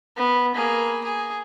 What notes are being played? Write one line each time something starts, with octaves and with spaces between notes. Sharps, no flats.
B3
A#3 G#4
G#4